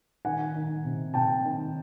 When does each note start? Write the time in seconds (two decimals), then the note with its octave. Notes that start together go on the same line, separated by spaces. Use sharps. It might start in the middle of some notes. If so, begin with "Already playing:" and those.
0.25 D#3 F#5 G#5
0.56 D#3
0.85 C3
1.14 C3 G5 A5
1.44 D#3